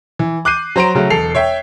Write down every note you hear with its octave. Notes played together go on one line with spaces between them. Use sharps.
E3
D6 F#6 G6 C7 D#7
F#3 C5 A#5 C6 D7
C#3 F#3 A3
E1 A4 C7 F7
C#5 E5 G5